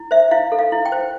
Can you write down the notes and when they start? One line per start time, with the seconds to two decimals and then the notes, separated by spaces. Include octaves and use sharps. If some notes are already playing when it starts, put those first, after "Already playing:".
Already playing: E4
0.11 C5 E5
0.31 E4 F5
0.52 A4
0.59 F5
0.72 E4
0.85 G5
0.92 C5